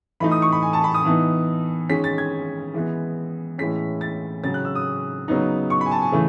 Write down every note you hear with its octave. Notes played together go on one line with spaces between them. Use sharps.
E3 A3 D#4 B5
D#6
C#6
B5
G#5
A5
B5
D#6
E3 B3 D#4
D#3 G#3 C#4 B6
A6
G#6
E3 G#3 B3
A2 E3 G#3 C#4 B6
A6
C#3 F#3 C#4 A6
F#6
E6
D#6
C#3 F#3 B3 D#4
C#6
G#5 B5
A5
G#5
C#3 E3 A3